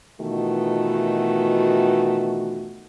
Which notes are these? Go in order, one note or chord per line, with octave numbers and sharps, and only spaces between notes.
B2 D#3 E3 A3 F4 F#4